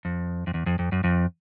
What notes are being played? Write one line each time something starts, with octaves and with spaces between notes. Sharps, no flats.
F2
F2
E2
F2
F2
F#2
F2